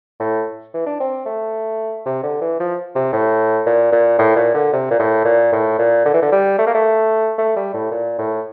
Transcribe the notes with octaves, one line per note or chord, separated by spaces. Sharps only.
A2
E3
D4
C4
A3
C3
D3
E3
F3
C3
A2
A#2
A#2
A2
A#2
D3
C3
A#2
A2
A#2
A2
A#2
D3
E3
D3
G3
A3
A#3
A3
A3
G3
A2
A#2
A2